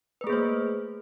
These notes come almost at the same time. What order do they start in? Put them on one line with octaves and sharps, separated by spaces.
B4 A3 G#4 A#3 C5